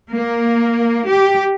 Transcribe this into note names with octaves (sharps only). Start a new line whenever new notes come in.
A#3
G4